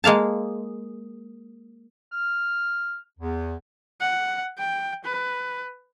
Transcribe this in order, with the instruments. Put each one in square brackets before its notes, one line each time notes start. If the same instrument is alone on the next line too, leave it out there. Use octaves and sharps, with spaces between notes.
[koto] G#3 A#3 F5 A5
[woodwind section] F6
E2
[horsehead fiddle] F#5
G5
B4